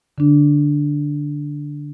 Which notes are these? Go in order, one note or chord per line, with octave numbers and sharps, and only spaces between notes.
D3 D4